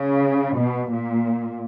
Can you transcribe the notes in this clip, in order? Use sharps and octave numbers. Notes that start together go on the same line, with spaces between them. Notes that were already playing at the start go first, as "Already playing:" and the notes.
Already playing: C#3
B2
A#2